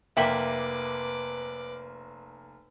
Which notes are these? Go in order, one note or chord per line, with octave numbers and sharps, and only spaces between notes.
F1 A#3 B4 E5 G5 D6 F#7